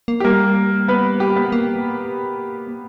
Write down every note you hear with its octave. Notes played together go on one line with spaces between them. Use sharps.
A#3
G4
G3 A#3 A#4
B3 B4
G4
B3 B4
A#3